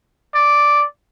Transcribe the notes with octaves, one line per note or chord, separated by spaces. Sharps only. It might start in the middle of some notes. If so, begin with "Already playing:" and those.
D5